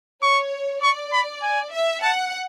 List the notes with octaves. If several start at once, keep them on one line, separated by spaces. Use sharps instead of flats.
C#5 C#6
D5 C#6
B5
G#5
E5
F#5 A5